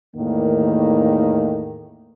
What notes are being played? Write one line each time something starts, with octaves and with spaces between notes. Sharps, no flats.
E2 A2 D#3 A#3